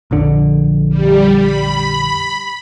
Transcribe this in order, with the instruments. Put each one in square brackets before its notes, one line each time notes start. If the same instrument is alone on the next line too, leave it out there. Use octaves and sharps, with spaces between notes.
[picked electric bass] A#1 F2 D3
[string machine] G3
B5